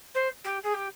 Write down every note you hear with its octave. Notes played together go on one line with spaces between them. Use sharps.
C5
G4
G#4
G4